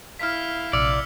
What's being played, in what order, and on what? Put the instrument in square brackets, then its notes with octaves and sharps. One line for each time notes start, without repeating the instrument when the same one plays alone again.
[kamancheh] E4 F5 [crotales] F6 B6
[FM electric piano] A#1 C3 [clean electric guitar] D5 [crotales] E6 C#7 F7